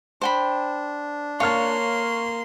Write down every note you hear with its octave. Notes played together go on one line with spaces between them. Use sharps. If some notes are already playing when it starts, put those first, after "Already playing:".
D4 C5 G5 B5
A#3 C#5 F5 A5 C6 C#6 F6